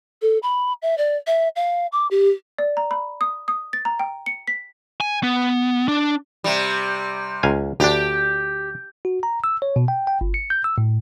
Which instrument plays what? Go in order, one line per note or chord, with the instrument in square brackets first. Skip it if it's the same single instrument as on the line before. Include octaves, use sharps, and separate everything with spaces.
[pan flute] A4
B5
E5
D5
E5
F5
D6
G4
[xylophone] D5
A#5
B5
D#6
D#6
A6
A#5
G5
C#7
B6
[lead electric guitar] G#5
B3
D4
[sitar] C3 G3
[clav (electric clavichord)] C#2 F5 G#5
[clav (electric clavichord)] D2 D4 [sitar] G4
[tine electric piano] F#4
A#5
E6
C#5
B2
G5
G5
G1
C#7
G6
E6
A2